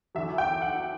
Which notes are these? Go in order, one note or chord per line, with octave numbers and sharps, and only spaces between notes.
E2 D3 F#3 E5
G5
F#5